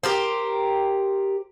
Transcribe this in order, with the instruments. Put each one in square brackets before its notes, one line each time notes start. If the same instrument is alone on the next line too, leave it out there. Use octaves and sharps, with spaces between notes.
[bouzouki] G4 A#4 C5